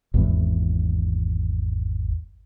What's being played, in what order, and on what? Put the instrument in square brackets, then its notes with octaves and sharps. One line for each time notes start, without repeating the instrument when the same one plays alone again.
[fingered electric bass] G#1 E2 E3